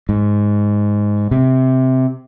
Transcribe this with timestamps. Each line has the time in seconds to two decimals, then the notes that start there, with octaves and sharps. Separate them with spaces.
0.09 G#2
1.31 C3